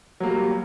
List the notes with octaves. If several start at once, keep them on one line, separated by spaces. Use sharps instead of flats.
F#3 G3 A#3